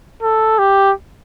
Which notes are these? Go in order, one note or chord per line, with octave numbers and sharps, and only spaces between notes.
A4
G4